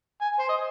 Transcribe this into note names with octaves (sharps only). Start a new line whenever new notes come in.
G#5
C5
D#5